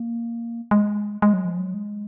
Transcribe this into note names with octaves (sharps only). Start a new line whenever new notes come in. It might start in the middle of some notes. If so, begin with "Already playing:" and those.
Already playing: A#3
G#3
G#3
F#3
F3
F#3
G#3